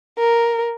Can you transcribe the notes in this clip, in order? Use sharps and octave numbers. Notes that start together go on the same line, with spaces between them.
A#4